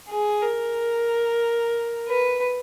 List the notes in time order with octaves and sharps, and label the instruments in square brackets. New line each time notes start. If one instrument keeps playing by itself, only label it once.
[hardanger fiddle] G#4
A#4
B4